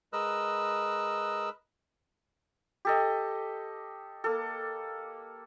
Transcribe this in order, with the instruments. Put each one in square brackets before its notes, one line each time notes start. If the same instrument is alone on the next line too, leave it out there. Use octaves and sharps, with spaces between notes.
[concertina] G#3 A#4 B4 D#5 E6 F#6
[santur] G4 A4 D#5
A#3 A4